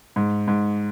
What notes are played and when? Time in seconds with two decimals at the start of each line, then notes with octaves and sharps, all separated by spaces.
0.16 G#2
0.48 G#2